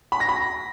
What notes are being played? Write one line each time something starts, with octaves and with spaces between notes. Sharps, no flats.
B5
A#6
B5